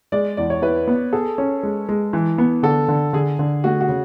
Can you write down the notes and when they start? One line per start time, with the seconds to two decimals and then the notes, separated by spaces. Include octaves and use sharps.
0.12 G#3 D5
0.37 E2 D5
0.50 C#5
0.62 E4 B4
0.87 B3
1.13 G#4 A4
1.38 C#4
1.63 G#3
1.89 G#3
2.13 E3
2.38 B3
2.63 D3 A4
2.88 D3
3.13 D3 G#4
3.39 D3
3.64 A3 F#4
3.81 F#4
3.89 C#3